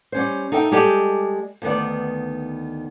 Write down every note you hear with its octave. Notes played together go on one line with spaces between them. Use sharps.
G3 C#4 C5
D#4 A4 E5 G5
G3 G#3 G4 A4 D#5
D2 D#3 B3 B4 D5